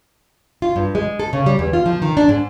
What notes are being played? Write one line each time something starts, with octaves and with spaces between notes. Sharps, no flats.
F4
G2
G#3
A4
C#3
G3
E2
F4
F3
D#3
D4
G#2